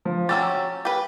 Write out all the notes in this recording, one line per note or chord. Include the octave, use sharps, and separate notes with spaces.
F3
F#3 C#4 G4 E6 A6
G4 B4